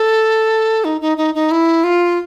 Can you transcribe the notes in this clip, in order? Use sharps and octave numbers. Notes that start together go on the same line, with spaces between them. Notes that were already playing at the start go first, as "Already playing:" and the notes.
Already playing: A4
D#4
D#4
D#4
D#4
E4
F4